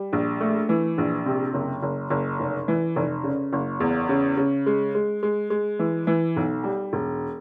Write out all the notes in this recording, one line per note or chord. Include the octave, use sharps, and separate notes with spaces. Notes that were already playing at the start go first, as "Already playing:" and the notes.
Already playing: G3
A#1
A3
E3
A#1
C3
F#1
F#1
F#1
F1
E3
F1
C#3
F#1
E2
C#3
C#3
G#3
G#3
G#3
G#3
E3
E3
B1
G3
E1